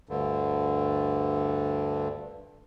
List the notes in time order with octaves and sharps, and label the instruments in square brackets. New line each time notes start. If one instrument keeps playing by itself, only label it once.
[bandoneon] D2 G2 D3